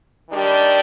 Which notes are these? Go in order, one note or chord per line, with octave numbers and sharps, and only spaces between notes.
D#3 G3 D4 G4